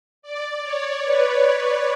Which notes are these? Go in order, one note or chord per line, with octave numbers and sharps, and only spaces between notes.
D5
C#5
B4